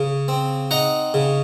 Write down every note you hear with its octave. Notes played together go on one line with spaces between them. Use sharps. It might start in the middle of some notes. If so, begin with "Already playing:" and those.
Already playing: C#3
C4
D#4 F#5 A#5
C#3